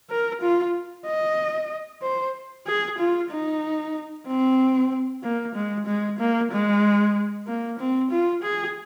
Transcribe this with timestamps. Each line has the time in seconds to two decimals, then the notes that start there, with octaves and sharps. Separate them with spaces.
0.10 A#4
0.41 F4
1.06 D#5
2.02 C5
2.66 G#4
2.99 F4
3.30 D#4
4.27 C4
5.23 A#3
5.55 G#3
5.86 G#3
6.19 A#3
6.51 G#3
7.47 A#3
7.79 C4
8.11 F4
8.43 G#4